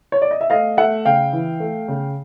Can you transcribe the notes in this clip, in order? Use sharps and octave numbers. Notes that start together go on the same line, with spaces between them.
C#5
D5
D#5
E5
A3 D#5 F5
A3 E5 F#5
C#3 F5 G5
E3
A3
C#3